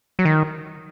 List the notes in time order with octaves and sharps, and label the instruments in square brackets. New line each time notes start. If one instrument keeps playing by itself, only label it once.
[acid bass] F#3
D#3